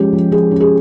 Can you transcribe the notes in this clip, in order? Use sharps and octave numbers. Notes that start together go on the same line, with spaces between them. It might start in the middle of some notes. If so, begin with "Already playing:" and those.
Already playing: F3 G#3 C#4 G4
F3
F3 G#4
C#4
G#4